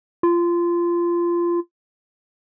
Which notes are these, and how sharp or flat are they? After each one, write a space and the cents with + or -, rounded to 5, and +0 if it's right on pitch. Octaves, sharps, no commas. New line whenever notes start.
F4 -20